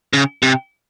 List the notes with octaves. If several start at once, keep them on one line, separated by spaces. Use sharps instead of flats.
C#3
C3